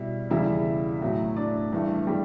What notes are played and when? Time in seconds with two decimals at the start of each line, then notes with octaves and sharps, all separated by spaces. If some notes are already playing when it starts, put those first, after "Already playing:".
Already playing: B2 G3 E4 E5
0.30 E2 C#3 G3 E4 E5
1.02 A2 F#3 A3
1.37 D4 D5
1.72 G2 E3 A3
2.07 G3 G4